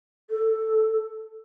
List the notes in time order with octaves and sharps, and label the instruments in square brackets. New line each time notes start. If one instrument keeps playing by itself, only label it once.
[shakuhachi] A4